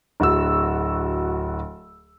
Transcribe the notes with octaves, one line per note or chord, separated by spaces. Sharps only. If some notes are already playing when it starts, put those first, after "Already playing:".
D1 F#4 E6